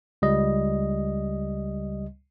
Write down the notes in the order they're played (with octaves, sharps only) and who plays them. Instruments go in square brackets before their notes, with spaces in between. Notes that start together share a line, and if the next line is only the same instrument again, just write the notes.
[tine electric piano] C#2 G3 D#5